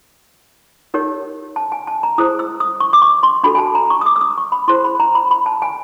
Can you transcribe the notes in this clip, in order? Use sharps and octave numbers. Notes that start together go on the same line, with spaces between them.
D#4 G4 A#4 C#5
A5
G#5
A5
A#5
E4 G#4 C5 D#6
E6
D#6
C#6
D6
C#6
C6
D4 F#4 A4 B5
G#5
A5
A#5
C#6
D#6
D6
E6
D#6
C#6
B5
E4 G#4 C5 C6
B5
A#5
B5
B5
A5
G#5